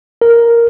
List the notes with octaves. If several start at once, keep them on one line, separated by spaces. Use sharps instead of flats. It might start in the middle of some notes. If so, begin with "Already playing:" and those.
A#4